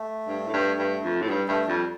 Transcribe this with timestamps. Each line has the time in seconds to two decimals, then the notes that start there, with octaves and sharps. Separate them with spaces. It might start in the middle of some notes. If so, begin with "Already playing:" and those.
Already playing: A3
0.28 G2
0.48 A2
0.53 G2
0.79 G2
1.04 F2
1.21 A2
1.30 G2 G3
1.48 G2 A3
1.68 F2 G3